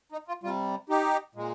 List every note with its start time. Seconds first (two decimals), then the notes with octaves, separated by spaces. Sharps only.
0.12 D#4
0.28 F4
0.43 C3 G3 F4
0.90 D#4 G4
1.35 A#2 G#3